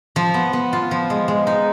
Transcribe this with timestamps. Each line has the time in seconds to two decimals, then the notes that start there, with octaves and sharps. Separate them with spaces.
0.16 F3
0.34 B3
0.53 B3
0.73 F4
0.91 F3
1.10 G#3
1.28 G#3
1.47 D#4